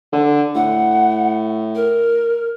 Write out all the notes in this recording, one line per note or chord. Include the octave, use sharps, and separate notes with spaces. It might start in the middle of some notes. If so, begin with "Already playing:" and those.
D3
A2 F#5
A#4